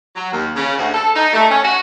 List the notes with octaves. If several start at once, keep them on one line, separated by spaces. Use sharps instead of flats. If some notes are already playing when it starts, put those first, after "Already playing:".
F#3
D#2
C#3
D2
A4
D#4
A3
C#4
F#4